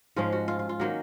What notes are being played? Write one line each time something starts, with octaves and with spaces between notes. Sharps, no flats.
G#2 F3 G#3 C#4 F4
F#4
F4
F4
F4
D#3 F#3 A#3 C#4 F#4